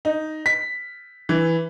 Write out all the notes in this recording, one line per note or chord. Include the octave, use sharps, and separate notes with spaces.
D#4
B6
E3